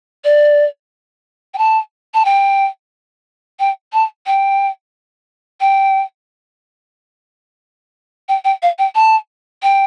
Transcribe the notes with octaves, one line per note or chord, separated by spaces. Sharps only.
D5
G5
A5
A5
G5
G5
A5
G5
G5
G5
G5
F5
G5
A5
G5